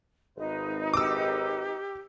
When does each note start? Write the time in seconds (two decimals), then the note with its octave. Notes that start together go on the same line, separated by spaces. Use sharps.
0.37 G#1 D#4 B4
0.94 G4 D6 E6